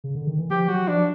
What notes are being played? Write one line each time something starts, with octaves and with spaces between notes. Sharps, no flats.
C#3
D3
D#3
E3
F3 G4
F#3 F#4
F3 D4